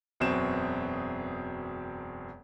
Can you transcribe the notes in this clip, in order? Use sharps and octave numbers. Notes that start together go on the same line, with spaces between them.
E1 F#2 B2 C4 E7